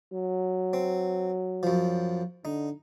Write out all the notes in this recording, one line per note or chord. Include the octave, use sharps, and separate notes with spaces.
F#3
C4
F#2 F3
D3 D#4